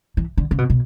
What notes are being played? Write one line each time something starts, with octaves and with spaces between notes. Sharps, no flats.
E3
D3
C#3
B2
B2